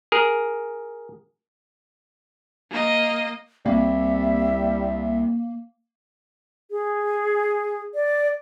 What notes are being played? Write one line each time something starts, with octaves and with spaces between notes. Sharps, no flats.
G#4 A#4
A#3 D#5
C2 C3 G3 A#3 E5
G#4
D5